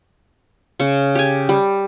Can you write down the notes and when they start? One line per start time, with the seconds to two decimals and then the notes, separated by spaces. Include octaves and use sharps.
0.80 C#3 C#6
1.15 G4 G#5
1.49 G3